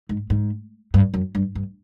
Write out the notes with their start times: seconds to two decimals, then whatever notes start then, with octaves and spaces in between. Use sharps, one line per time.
0.09 G#2
0.30 G#2
0.94 G2
1.14 F#2
1.35 G2
1.55 G2